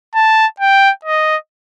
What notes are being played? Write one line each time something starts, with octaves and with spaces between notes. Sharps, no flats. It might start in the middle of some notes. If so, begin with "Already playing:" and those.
A5
G5
D#5